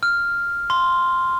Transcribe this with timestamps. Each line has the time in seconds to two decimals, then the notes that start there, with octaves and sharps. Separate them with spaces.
0.03 F6
0.70 C6